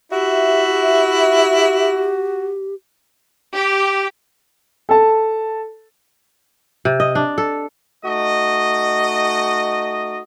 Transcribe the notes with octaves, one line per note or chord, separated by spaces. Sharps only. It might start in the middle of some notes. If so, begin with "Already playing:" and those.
E4 F#4 G4 E5
G4
A4 A5
C3
D#5
D4
A4
A3 D#4 F#4 D#5